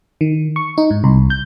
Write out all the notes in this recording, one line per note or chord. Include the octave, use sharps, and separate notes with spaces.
D#3
C#6
D#4
G#2
C2
G6